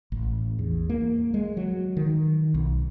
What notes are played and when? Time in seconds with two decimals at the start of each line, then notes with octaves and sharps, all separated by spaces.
0.12 A1
0.59 E2
0.89 A#3
1.34 G#3
1.57 F#3
1.97 D#3
2.54 B1